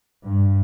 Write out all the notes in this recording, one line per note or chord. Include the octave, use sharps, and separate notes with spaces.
G2